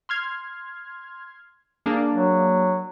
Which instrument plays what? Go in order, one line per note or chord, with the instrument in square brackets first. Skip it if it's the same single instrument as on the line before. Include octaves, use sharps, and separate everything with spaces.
[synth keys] C6 F6 G#6
A#3 D4 G#4
[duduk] F#3